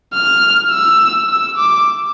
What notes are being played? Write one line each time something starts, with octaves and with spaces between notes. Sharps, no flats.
F6
E6
E6
D6